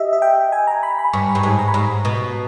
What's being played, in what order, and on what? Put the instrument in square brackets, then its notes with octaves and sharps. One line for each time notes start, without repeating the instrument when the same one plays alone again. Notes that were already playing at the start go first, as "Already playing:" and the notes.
Already playing: [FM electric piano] G4 D#5 E5
E5
G5
G#5
A#5
B5
B5
[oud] G2 [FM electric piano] C#6
[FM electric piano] B5
[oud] G2
[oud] G#2 [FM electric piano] G#5
[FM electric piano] A#5
B5
[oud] G#2 [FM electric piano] A#5
[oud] B2